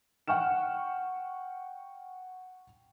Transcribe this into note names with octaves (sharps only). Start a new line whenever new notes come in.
F#5 G5 C#6 F6 E7